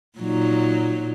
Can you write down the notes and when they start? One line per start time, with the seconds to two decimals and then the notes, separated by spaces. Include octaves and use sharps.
0.18 A#2 F#3 D#4